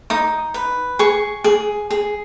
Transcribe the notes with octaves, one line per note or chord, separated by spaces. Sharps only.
D#4 D#6
B4
G#4 C#6
G#4
G#4